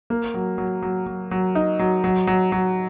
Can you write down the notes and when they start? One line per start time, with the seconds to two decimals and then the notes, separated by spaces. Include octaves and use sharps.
0.10 A#3
0.34 F#3
0.58 F#3
0.82 F#3
1.06 F#3
1.31 F#3
1.55 D#4
1.79 F#3
2.04 F#3
2.27 F#3
2.52 F#3